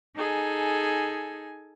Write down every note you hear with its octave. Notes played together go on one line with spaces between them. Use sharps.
D#4 G#4 A4 G#5